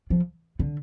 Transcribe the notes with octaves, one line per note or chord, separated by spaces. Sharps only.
F3
D3